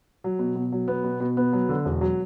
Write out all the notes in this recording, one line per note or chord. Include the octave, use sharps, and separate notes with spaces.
F#3
B2
B2
F#3
B3
B2
B2
B3
F#3
D3
E1
F#3